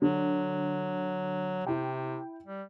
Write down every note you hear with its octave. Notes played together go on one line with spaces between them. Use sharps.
D3 F#3
C3 E4 G5
G3